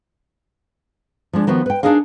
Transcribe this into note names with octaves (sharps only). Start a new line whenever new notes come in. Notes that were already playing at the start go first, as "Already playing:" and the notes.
F3 G#3 D4
D#3 F3 B3 F#4
B4 G5
D4 D#4 G#4 A#4 F5